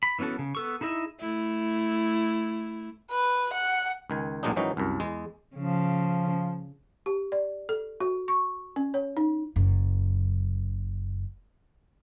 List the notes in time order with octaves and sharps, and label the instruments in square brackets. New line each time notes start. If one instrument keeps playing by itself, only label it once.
[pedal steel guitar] B5
E3 B3 C#4 F#4 A4
C#3
B3 A4 C#6
D#4 E4 G#4 D#5 E5
[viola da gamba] A3 E4
[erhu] B4
F#5
[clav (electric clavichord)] C#2 D#3 G#5
A1 A#2 F#3 G#3 D4 D#4
G#2 D#3 E3 F#3 C#4 D#4
C2 F#2
E2 G#3
[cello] C#3 [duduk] F3
[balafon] G4
D5
A4
F#4
C#6
C#4
C#5
D#4
[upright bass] F#1 F#2